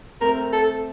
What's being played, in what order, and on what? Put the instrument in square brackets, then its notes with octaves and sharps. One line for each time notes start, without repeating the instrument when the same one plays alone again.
[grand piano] A3 C4 [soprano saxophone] A#4
[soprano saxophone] A4